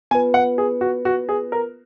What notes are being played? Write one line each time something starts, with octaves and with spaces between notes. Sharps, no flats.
B3 F4 B4 G#5
F#5
G#4
F#4
F#4
G#4
A#4